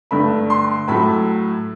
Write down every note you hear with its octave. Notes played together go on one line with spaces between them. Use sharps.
G2 D3 A3 B5
C6
A2 F#3 A3 B5